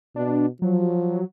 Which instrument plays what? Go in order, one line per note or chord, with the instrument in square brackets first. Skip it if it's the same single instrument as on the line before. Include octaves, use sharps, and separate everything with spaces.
[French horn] B2 [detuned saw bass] D4
[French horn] F3 [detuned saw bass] F#3